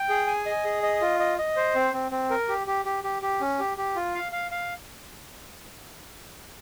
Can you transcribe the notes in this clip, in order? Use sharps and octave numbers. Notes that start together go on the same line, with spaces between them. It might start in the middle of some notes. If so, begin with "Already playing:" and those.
Already playing: G5
G#4
G#5
D#5
G#4
D#5
F4
D#5
D#5
C5
C4
C4
C4
A#4
G4
G4
G4
G4
G4
C#4
G4
G4
F4
F5
F5
F5